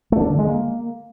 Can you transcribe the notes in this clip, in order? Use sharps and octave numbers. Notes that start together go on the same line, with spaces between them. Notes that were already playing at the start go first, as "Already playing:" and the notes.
A3
D4
D3
G#3
A#3